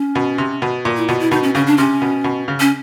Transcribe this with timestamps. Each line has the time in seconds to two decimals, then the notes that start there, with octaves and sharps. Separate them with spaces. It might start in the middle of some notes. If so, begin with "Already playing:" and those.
Already playing: C#4
0.15 B2
0.38 C3
0.62 B2
0.85 A#2
0.97 E4
1.08 B2 F4
1.20 E4
1.31 B2 D#4
1.43 C#4
1.55 C#3 C#4
1.67 D4
1.78 C3 C#4
2.02 B2
2.24 B2
2.48 C#3
2.60 C#4